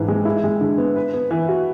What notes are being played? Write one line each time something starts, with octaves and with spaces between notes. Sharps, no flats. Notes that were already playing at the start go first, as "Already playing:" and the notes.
Already playing: G#2 E3 D4
G#3
E4
G#3
D3
B3
B4
B3
E3
F#4